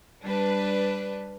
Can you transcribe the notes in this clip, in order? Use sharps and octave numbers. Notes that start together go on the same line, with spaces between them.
G3 D4 B4